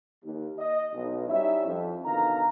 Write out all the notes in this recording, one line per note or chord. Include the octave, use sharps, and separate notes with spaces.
D#2
D#5
B1
G3 C#4 D#4 E4 C#5 E5
F2
B2 D3 D#3 F5 A#5